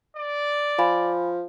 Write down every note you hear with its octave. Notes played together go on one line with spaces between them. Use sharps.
D5
F3 F5 G#5 B5